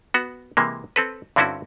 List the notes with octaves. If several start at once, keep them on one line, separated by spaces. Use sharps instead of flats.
B3 F#4
C3 E3 G#3 A#3
C4 A4 B4
G2 D3 C4 C#4 E4 F#4